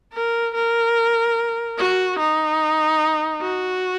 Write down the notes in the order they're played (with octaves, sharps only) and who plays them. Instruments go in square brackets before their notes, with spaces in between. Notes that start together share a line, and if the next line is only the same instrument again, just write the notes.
[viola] A#4
A#4
F#4
D#4
F#4